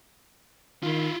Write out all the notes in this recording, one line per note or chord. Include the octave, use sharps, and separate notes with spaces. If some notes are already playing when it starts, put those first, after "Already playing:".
D#3 E4 F4